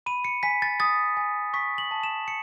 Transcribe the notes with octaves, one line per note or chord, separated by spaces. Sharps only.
B5 D#7
C#7
G#5 B6
A6
D#6 A6
G#5
C#6 B6
F#7
A5
E7
C#7